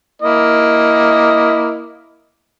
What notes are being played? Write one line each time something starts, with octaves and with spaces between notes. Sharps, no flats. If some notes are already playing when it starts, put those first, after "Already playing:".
A#3 E4 D#5